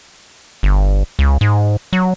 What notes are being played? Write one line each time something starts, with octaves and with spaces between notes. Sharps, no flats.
G1
C#2
G#2
F#3